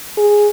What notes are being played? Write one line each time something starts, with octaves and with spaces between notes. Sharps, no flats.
G#4